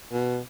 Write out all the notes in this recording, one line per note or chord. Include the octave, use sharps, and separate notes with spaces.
B2